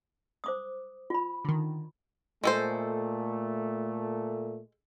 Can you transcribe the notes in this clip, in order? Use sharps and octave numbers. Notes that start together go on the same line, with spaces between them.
C5 D6 D#6
F4 B5
D3 D#3
A#2 G#3 A3 A4 C5